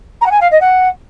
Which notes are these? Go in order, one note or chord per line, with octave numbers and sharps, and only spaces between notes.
A#5
F#5
G#5
F5
D#5
F#5